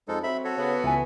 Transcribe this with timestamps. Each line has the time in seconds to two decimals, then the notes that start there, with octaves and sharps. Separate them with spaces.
0.08 F2 G#3 D#4 A4
0.23 F#3 C4 E5 B5
0.44 F#4 A4 C#5
0.58 C#3 B3
0.84 C#2 E3 G#5